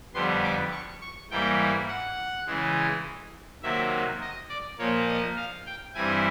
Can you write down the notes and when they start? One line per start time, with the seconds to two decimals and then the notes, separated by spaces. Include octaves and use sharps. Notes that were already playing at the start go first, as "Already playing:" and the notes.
0.14 F2 D3 G3 B3 C6
0.43 D6
0.72 C#6
1.01 C#6
1.30 G#2 E3 G3 A#3 G5
1.88 F#5
2.46 C#3 E3 G#3
3.63 C3 D#3 F#3 A#3 E5
4.21 D#5
4.49 D5
4.79 A#2 F3 A#3 C#5
5.08 D#5
5.37 F5
5.66 G5
5.95 G2 E3 G3 C4 E4 G#5